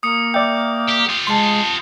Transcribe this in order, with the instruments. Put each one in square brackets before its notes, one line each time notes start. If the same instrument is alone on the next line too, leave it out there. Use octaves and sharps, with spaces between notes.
[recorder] A#3 [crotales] D#6 C#7
[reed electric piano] D5 E5 G5 [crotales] G6
[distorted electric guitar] G4
F4 G4
[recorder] G#3 [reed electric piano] A5 C6